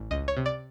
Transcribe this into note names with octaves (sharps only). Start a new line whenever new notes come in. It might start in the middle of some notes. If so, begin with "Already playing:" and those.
Already playing: A1
C#2 D#5
C#5
C3
D5